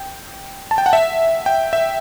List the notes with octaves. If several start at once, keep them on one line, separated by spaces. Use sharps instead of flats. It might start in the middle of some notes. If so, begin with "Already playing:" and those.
Already playing: G5
A5
G5
F#5
E5
G5
E5